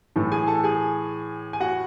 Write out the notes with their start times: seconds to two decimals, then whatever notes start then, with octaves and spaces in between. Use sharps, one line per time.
0.16 A2 E3 A4
0.32 G#4 G#5
0.48 A4 A5
0.64 G#4 G#5
1.53 G#5
1.60 F#4 F#5